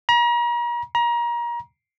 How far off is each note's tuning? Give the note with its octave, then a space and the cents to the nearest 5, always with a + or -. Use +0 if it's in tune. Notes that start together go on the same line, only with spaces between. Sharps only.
A#5 +40
A#5 +30